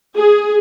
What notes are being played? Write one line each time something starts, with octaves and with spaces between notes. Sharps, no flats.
G#4